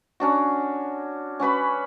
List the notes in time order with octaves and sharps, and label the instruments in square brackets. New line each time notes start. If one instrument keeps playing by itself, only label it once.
[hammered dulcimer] C#4 D4 F#4
C#4 F#4 B4 B5